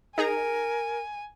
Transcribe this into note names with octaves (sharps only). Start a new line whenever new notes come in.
D#4 G#4 A#4 G#5 A#5